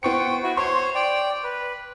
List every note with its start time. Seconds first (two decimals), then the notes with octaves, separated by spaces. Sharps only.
0.03 B3 C5 G5 C#6 C#7
0.43 E4 F#4
0.57 C5 C#5 C6 C#6
0.95 D5 G5
1.44 B4